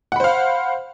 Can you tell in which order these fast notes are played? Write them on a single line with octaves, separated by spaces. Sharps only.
F#5 B5 C5 F5